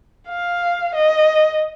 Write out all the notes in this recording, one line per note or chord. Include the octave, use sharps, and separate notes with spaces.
F5
D#5